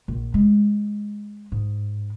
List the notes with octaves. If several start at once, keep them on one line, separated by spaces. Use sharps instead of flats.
A#1
G#3
G#2